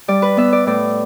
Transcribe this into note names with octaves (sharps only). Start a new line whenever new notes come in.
G3 D5
B4
B3 E5
D5
A2 D5